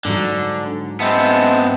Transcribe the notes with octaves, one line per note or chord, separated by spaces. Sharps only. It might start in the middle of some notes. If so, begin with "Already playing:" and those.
G#2 D3 F#3
G#3 B3 C4 E5 A5